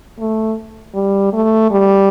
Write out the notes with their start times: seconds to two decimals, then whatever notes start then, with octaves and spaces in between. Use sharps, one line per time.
0.20 A3
0.95 G3
1.33 A3
1.71 G3